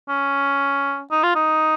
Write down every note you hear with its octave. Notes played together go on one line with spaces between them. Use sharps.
C#4
D#4
F4
D#4